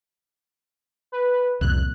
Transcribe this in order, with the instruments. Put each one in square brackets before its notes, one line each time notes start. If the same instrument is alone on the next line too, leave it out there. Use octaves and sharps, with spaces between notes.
[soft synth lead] B4
[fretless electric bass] C2 F2 A#2 [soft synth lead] F#6